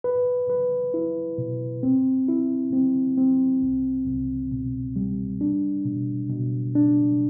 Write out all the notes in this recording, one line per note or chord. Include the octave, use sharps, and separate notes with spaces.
B4
B4
E4
B2
C4
E4
C4
C4
C2
C2
B2
G3
D4
B2
B2
D4